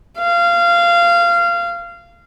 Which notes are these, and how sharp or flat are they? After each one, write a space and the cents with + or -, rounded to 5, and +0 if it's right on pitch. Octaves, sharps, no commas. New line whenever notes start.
F5 -20